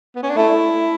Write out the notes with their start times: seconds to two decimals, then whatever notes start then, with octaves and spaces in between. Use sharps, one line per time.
0.16 B3
0.23 C#4
0.30 D4
0.36 A3 E4